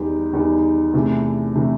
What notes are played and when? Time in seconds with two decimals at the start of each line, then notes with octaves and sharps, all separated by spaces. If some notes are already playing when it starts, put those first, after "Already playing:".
Already playing: E2 D#3 G3 D#4 G4
0.33 E2 D#3 G3 D#4 G4
0.93 E2 C3 E3 A3
1.55 C3 E3 A3